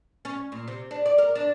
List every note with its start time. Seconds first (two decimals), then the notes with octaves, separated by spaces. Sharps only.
0.25 C#4
0.52 A#2
0.68 C3
0.91 D4
1.06 D5
1.18 A#4
1.35 D4